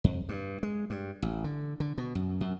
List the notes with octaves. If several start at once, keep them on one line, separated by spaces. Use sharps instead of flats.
F2
G2
G#3
G2
A1
D3
D3
B2
F#2
F#2